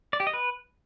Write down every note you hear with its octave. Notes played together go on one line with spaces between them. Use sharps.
D5
G4
D#5
B4